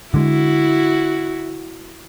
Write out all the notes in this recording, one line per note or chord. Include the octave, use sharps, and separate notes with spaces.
D3 G#3 E4 F#4